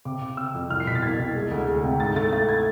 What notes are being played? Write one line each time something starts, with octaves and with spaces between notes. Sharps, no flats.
C3 D6
C3
C3 E6
F2
C2 F6
C7
B2 B6
A6
C2 G#6
C2
G#3
D2
G#3
C3
G#2 A6
A3 A6
A3 A6
E4 G#6